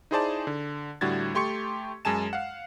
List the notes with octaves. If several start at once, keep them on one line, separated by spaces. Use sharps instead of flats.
D#4 E4 G#4 C5 D5 A5
D3
A2 D3 G3 F#4 G#6 A6
A3 G4 C6 C#6 C#7
F#2 G#3 G#5 A5 E7
F5 F#5